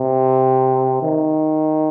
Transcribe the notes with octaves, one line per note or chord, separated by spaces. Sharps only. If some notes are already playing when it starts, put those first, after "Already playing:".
Already playing: C3
D#3